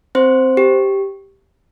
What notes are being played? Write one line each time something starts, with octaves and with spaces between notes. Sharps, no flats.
C4 C5
G4